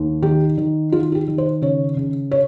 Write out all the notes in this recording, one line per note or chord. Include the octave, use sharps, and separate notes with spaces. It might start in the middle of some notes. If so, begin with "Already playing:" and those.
Already playing: D#2
D#3 G4
D#3
D#3 F4
F4
G4
D#3
C5
C#3 C#5
C#3
C#5